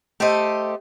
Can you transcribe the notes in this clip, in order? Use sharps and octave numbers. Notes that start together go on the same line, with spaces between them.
A3 G4 A4 C5 D#5